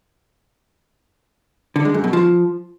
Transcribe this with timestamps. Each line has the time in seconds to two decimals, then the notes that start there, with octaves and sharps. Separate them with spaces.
1.76 D3
1.85 G#3
1.94 F#2
2.04 B2
2.13 F3